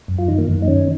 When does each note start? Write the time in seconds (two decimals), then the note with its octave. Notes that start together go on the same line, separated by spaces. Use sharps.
0.08 F#2
0.18 F4
0.28 D#3 D#4
0.38 A#3
0.48 F#2
0.62 D#4
0.67 D#3 C#4